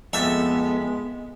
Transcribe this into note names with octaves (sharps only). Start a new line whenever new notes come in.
F2 G#3 A3 B3 E5